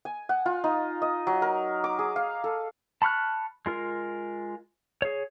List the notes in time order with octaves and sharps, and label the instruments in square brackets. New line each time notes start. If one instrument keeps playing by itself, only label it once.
[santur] G#5
F#5
F4
D#4
D#5
F#3
A#4
D6
G#4
F5
A4
[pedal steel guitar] A5 B5 C#6 F6 F#6
G#3 F4 A#4
G#4 C#5